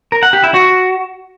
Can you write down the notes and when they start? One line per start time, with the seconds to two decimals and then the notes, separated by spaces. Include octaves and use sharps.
0.12 A#4
0.23 F#5
0.33 G4
0.44 E4
0.54 F#4